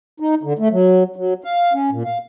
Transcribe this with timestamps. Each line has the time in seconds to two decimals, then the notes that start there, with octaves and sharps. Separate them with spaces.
0.20 D#4
0.43 D3
0.59 A3
0.71 F#3
1.16 F#3
1.44 F5
1.73 C#4
1.92 A#2
2.05 F5